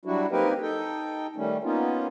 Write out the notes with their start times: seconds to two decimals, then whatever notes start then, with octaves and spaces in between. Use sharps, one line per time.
0.05 F#3 G3 D4 E4 F#4
0.31 A#3 C4 D#4 G4 A#4 B4
0.62 D#4 A4 G5
1.36 D#3 G3 A3 C#4
1.64 A#3 B3 C#4 D#4 F4